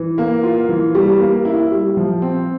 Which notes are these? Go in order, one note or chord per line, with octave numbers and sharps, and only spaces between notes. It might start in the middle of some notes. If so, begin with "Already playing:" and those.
Already playing: E3
A#3
F4
E3
G3
A#3
E4
G3
F3
C4